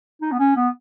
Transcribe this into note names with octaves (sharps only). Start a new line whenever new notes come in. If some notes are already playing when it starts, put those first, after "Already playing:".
D#4
B3
C#4
B3